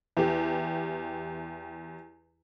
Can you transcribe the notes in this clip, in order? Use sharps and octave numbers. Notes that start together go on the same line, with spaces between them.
E2 G4